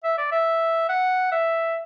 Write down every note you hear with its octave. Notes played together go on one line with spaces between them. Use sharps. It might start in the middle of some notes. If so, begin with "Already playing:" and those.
E5
D5
E5
F#5
E5